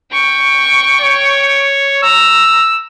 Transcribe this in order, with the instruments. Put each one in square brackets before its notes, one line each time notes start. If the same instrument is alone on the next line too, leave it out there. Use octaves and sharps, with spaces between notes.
[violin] G5 C#6
[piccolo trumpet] C#5
[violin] A#5 [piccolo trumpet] E6